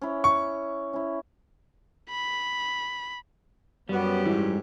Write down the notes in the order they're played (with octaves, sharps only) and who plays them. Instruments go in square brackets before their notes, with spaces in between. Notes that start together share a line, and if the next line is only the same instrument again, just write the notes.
[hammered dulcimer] C#4 E4
[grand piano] C#6
[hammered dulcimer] C#4 E4
[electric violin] B5
[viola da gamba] F#2 C#4 G4 [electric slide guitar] G3 [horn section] B3
[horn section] G#2 [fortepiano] E3